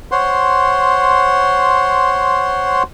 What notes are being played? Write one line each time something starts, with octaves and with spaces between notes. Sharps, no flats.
C5 C#5 F#5 C6